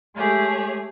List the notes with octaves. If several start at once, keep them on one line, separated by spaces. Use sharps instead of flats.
G#3 A3 G4 G#4 C#5